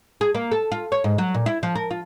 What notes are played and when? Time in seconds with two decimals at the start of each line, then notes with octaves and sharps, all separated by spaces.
0.21 G#4
0.35 A#3
0.52 A4
0.72 F4
0.92 C#5
1.04 G#2
1.18 F#3
1.34 A#2
1.46 E4
1.63 F3
1.76 A#4
1.91 F4